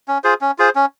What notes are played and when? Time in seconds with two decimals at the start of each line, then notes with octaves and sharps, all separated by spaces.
0.08 C#4
0.24 F4 G#4 C5
0.41 C#4
0.58 F4 G#4 C5
0.75 C#4